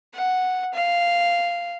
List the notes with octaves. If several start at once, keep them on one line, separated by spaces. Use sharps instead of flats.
F#5
F5